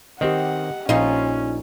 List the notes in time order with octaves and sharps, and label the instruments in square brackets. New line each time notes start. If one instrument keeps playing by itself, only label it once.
[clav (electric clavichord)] D#3 C4 [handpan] G4 D#5 [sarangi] F#5
[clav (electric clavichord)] A#1 [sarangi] C#4 [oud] D#4 F4